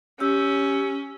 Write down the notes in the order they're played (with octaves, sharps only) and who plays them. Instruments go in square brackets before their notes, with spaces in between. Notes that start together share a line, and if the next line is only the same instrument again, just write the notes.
[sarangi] C#4 [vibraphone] G4 E6